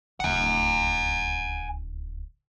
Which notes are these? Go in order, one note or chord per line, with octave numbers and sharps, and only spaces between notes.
D1 C#2 F#5 G#5